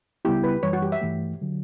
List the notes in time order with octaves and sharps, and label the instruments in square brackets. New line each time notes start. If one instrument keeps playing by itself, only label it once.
[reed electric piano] C#2 C#3 G3 B3 E4 [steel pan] G4
[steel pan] B4
[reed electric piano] F#2 E3 G3 [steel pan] C#5
[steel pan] F#4
G4
E5
[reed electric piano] G2 E3 A3
D3 F#3